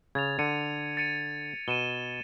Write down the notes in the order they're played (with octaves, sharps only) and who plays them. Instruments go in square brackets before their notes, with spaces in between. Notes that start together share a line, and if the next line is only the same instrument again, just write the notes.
[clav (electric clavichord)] C#3 [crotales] G#6 A6 F7
[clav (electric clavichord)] D3 [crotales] C#7 D#7
[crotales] A6 C#7 D#7
[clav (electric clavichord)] B2 [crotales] D#7 E7 G7